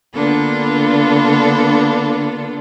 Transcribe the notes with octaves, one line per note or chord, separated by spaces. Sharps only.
D3 A#3 B3 D4 F4 A4